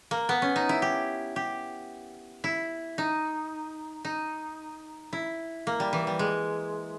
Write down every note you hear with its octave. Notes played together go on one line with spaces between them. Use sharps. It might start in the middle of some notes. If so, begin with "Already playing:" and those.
A#3
B3
C#4
D#4
E4
G4
G4
E4
D#4
D#4
E4
A#3
G3
E3
G3
G#3